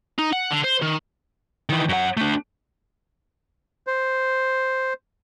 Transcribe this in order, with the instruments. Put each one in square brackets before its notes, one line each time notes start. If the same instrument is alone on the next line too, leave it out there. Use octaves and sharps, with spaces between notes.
[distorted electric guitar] D#4
F#5
D3
C5
D#3
[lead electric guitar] D#3 E3
F#2 F#5
A3 D4
[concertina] C5